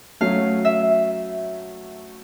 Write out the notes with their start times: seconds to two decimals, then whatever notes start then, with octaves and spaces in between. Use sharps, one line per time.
0.21 F#3 A3 C#4 F5
0.65 E5